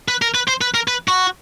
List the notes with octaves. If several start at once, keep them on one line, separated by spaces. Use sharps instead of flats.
B4
A#4
B4
C5
B4
A#4
B4
F#4